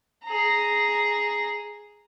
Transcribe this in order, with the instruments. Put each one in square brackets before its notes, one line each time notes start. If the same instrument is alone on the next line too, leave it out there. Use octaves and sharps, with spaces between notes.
[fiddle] G#4 A#5